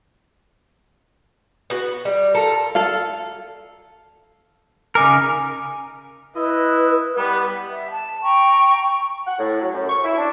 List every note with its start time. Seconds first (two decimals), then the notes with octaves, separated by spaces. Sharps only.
1.70 B3 F#4
2.05 G3
2.35 F4 A4 A#4
2.75 A4 F5
4.95 C#3 D#4 A#4 G#5 D6
6.35 E4 B4 D#5
7.16 G3 B3
7.69 E5
7.91 A5
8.22 G5 A#5 C#6
9.26 F#5
9.39 A2
9.61 F#3
9.73 F#2
9.89 C#6
10.04 E4
10.17 D4